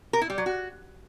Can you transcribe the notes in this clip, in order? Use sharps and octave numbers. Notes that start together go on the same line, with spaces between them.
A#4
E4
G3
F#3
F#4